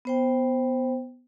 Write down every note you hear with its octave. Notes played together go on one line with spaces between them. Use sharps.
B3 C5 G5